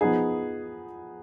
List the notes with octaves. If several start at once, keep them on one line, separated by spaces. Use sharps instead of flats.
F3 B3 D#4 G#4